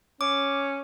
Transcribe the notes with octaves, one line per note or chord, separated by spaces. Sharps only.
C#4 D6